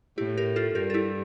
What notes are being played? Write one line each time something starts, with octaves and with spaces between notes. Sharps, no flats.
A2 E4 G4
G4 A#4
F4 A4
G2 G4 A#4
A4
E4 G4